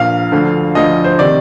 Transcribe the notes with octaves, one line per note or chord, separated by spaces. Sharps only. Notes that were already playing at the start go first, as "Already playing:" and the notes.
Already playing: A#1 A#2 F3 F5
D2 D3 F3
D2 D3 F3 D#5
C5
C3 D#3 D5